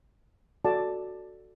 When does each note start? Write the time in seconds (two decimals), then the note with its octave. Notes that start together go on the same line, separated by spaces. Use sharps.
0.65 F#4 A4 D5 A5